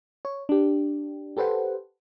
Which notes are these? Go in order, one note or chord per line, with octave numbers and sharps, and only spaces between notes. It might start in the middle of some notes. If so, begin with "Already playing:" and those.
C#5
D4 G4
G4 A4 B4 C5 F#5